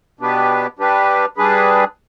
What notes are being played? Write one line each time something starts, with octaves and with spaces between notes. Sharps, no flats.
B2 B3 D4 G4 B4
G3 D4 G4 B4
G3 D4 G#4 B4